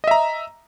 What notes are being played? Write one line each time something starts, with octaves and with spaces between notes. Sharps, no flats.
D#5 E5 A#5